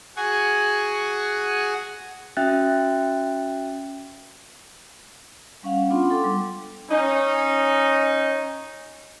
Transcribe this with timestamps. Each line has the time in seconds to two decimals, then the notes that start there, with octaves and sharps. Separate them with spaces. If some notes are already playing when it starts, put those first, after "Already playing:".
0.17 F#4 G#4 F#5 G#5 C#6
2.37 C#4 F#4 E5 G5 F#6 A6
5.63 G3 C#4 F5 F#5
5.90 B3 D4 F4 F#5 C6
6.10 A4 G5 C6 D6
6.24 G3
6.89 C#4 D#4